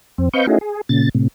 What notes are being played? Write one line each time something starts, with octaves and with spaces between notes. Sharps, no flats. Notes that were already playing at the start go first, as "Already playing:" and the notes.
F2 C4
C4 B4 D#5 F5 C#6 G6
A3 C#4 D#4 E4 F#4 G#4
G#4
A#2 C#3 A6
A2 C3